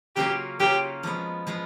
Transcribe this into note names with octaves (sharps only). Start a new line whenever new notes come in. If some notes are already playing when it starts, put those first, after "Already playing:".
C#3 F#3 A#3 C#4 F4 G4
C#3 F#3 A#3 C#4 F4 G4
F3 G#3 B3
F3 G#3 B3